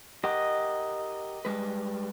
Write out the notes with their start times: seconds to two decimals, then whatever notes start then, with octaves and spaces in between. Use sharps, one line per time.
0.24 G4 A#4 D#5 F#5
1.45 G3 G#3 B4